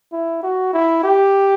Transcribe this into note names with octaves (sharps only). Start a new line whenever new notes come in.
E4
F#4
E4
G4